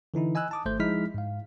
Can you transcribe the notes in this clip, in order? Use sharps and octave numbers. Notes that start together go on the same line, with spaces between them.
D3 E3 D#4 E4
D#5 G#5 B5 E6 F#6
A5 D6 D#6
G#1 A3 C5 G6
F3 G#3 D#4 E4 F6 B6
G#2 F5